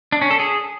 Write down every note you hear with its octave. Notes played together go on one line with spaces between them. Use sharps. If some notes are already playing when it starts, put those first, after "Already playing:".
D4
C#4
A4
G#4